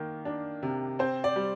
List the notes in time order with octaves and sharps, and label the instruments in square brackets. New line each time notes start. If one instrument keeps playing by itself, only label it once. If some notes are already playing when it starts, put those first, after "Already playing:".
Already playing: [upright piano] D#3 A#3
D4
C3
C4 C5
D5
G3